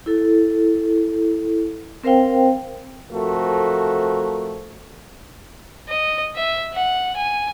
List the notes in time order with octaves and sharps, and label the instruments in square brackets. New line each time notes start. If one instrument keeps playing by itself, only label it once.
[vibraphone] E4 A4
C4 A#4 C5 F5 G5
[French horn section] C3 F3 A3 F#4 A4 A#4
[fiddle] D#5
E5
F#5
G#5